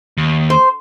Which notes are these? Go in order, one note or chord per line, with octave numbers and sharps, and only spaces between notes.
D#2
C5